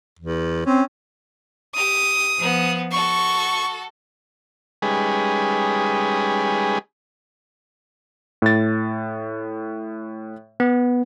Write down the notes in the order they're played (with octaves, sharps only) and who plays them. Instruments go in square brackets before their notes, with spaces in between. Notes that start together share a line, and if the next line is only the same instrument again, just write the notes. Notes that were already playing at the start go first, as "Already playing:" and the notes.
[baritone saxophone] E2
[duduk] C4 [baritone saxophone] C#4
[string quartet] G4 [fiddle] D#6
[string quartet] F3 B3
[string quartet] F#4 A4 [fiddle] C#6
[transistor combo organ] G3 G#3 C#4 D#4 G#4 B4
[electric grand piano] A2 A6
[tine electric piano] B3